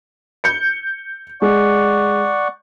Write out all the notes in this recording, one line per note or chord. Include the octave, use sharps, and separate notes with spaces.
G6 C#7
G#3 D5 F#5 C#6